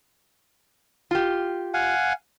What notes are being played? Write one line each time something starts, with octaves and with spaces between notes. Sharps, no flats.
F4 G4
F5 F#5 G#5